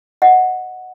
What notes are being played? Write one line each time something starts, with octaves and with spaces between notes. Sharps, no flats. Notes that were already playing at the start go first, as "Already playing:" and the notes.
D#5 F#5